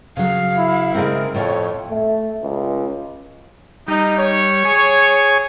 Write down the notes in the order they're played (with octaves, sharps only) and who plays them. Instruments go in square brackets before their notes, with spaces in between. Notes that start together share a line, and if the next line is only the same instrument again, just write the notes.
[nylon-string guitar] C#3 F#3 [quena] F5
[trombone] E4
[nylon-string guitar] C#3 G#3 C4 [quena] A#4
[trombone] F2 [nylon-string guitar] A2 [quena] C#5
[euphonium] A3
C#2
[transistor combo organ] G3 [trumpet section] D#4
[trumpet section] C#5
[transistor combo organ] G#4 G#5 C#6